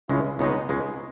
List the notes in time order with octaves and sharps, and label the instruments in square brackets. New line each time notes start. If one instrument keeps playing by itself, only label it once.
[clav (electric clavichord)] C#2 C#3 G#3 [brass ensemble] C#4 E4
[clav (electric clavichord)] C#2 C#3 G#3 [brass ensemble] B3 D#4
[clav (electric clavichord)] C#2 C#3 G#3